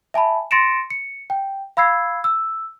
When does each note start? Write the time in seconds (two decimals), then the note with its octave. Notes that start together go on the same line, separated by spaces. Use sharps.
0.14 E5 G#5 A5 B5
0.51 C6 A6 A#6 C#7 D7 E7
0.90 C#7
1.30 G5
1.77 F5 B5 E6 G#6 C7
2.24 E6